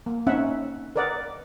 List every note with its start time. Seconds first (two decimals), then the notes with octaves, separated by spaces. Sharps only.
0.06 A#3
0.27 C4 C#4 D#4 E5 F#5
0.96 A#4 B4 D5 D#5 F#5